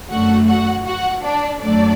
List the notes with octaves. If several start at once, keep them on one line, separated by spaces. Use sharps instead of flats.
F#2 D3 A3 F#4 F#5
F#4 F#5
F#4 F#5
D4 D5
F#2 F#3 A3 D4 D5